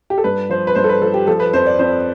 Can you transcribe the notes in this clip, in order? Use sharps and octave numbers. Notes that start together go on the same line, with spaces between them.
G4
A4
G2 B4
F3 C5
B4
G2 C5
A4
B4
F3 A4
G4
F3 A4
B4
F2 C5
D5
F2 C5